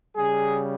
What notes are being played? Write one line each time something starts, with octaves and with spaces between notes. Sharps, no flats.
C#3 G3 G#4